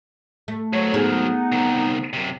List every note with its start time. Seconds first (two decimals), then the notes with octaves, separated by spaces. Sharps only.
0.48 A3
0.73 G#2 F#3 C#5
0.94 B3 D#4 G#4 A#4
1.52 C2 D#3
2.13 F#2 C3